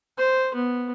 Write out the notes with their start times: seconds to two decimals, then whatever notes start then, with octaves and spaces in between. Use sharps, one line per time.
0.18 C5
0.54 B3